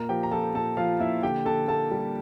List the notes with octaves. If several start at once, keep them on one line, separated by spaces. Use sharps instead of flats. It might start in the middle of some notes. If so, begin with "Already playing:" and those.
Already playing: A#2 A#4 A#5
F3 G4 G5
A#5
F3 A4 A5
A#2 A4 A5
F3 F4 F5
A#2 E4 E5
D3 G4 G5
D3 A4 A5
A#3 A4 A5
G3